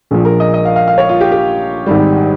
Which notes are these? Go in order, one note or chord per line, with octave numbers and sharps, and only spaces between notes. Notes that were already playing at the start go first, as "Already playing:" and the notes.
A#1 A#2 F3 G#4
A#4
D#5
D#5
F5
F5
F5
C#5
F4
G4
G4
G#1 G#2 G3